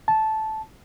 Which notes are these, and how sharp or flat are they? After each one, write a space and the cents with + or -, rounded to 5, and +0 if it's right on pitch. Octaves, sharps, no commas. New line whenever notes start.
A5 -10